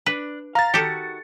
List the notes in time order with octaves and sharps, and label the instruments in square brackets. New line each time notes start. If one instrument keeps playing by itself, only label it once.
[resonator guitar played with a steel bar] D4 [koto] B4
[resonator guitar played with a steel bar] F5 [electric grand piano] A#5 A6
[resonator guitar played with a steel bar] D#3 F#4 [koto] G4 A4 [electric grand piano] C#7